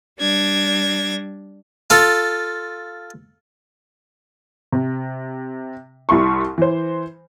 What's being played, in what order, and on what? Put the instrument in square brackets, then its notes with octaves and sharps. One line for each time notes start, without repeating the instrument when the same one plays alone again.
[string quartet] G3 D4 G#6 A#6
[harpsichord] F4 A4
[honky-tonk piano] C3
C2 G3 E4 C6 C#6
E3 C5